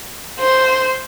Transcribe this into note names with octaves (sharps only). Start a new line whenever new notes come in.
C5